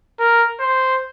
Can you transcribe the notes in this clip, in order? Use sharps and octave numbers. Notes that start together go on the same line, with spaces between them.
A#4
C5